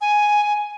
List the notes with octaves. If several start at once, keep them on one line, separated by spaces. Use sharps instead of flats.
G#5